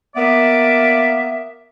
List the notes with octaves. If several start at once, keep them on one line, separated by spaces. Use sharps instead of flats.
A#3 B3 D5 E5